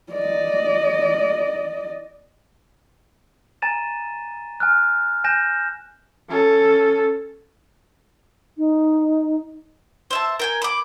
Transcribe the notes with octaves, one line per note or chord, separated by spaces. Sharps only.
D5 D#5
G#5 A#5 A6 D#7 E7
G#5 F6 F#6
G#5 F#6 G6 A#6 E7
C#4 A4
D#4
C5 E5 A5
A#4 G5 G#5
B5 D6